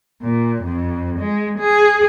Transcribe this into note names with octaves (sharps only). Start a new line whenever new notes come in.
A#2
F2
G#3
G#4